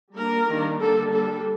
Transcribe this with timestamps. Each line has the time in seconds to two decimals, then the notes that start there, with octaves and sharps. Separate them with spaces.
0.15 G3 A#3 D4 A#4
0.48 D#3 G3 A#3 D4
0.79 D3 G3 A#3 D4 A4
1.12 G3 D4 A4